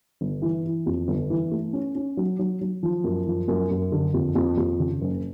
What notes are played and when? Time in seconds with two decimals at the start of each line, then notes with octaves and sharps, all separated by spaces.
0.21 G1
0.42 E3
0.65 E3
0.86 F2
1.08 G1
1.30 E3
1.51 A3
1.73 C#4
1.95 C#4
2.17 F#3
2.39 F#3
2.61 F#3
2.83 F3
3.04 F#2
3.26 F3
3.48 F#2
3.71 F#2
3.92 D3
4.14 F2
4.35 F2
4.57 F2
4.79 C#3
5.01 F#1